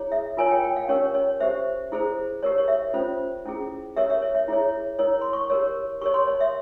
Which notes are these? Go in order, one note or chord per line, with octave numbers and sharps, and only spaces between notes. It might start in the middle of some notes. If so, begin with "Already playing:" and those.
Already playing: E4 G#4 C#5
E5
F4 A#4 C#5 G#5
G5
G5
F5
C#4 G4 A#4 C#5
C#5
G4 C5 E5
E4 G#4 C5
G4 A#4 C#5
C#5
E5
C#4 F4 C5
C#4 E4 G#4
G4 A#4 C#5 E5
E5
C#5
E5
E4 G#4 C#5
E4 A#4 C#5
C6
C#6
G4 A#4 C#5
G4 A#4 C#5 C#6
C6
C#5
E5